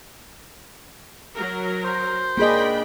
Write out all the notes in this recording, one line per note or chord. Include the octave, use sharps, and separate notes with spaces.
F#3 A#4
C5
A#3 D4 G#4 D#5 G5 B5